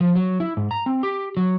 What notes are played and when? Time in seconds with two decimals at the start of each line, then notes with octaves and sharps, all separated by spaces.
0.01 F3
0.15 F#3
0.40 E4
0.57 G#2
0.71 A#5
0.86 C4
1.03 G4
1.37 F#3